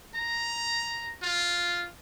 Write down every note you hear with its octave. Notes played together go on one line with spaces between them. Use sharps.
A#5
F4